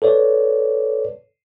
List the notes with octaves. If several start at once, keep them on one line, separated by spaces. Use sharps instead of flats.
A4 B4 C#5 D5